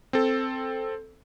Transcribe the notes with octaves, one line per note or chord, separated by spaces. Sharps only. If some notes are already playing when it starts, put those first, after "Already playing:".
C4 A4